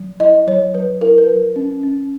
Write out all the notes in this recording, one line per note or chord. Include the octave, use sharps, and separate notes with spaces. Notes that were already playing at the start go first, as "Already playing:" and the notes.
Already playing: F#3
E4 D#5
F#3 C#5
F#3 B4
E4 A#4
B4
F#3 A#4
C#4
C#4